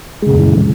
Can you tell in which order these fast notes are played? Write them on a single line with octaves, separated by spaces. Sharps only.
G#3 C#3 A#2 F#2 E3